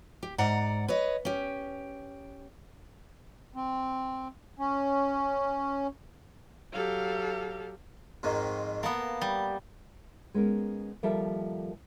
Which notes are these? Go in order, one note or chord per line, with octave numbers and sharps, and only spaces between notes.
G4
G#2 D5 F#5 A#5
B4 C#5 D#5
C#4 G4
C4
C#4
F#3 G4 A4 F5
F2 G#2 D#3
A#3 B3 A5
G3
G#3 B3 C#4 A#4
D#2 F3 G3 A4 A#4 E5